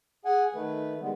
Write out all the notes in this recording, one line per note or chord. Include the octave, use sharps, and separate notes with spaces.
G#4 F#5 G#5
D#3 A3 B4
D3 D#3 G3 G#3 B3